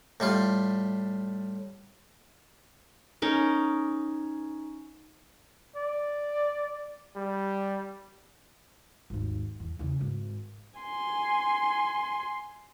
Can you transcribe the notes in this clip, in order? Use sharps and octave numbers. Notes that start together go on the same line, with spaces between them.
A2 G3 F4
C#4 D#4 A#4
D5
G3
G#1 D#2
E2
E2 C#3
G#1
G#5 C6